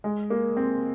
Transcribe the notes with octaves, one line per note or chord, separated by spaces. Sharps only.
G#3
A#3
C4